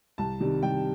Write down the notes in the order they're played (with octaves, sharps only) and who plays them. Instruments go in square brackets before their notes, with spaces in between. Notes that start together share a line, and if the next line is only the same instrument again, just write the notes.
[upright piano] C2 A5
C3 D#3 G3
C2 G5